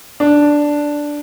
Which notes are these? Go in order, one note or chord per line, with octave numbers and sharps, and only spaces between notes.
D4